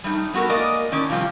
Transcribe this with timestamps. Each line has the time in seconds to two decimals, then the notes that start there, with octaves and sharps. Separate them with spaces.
0.04 G3 A3 D#4
0.33 G3 B3 F#4 A4 A#4
0.49 G#3 A#3 A#4 D5 D#5
0.92 A2 D#3 C#4 D5
1.09 C3 F3 G3 C4 F4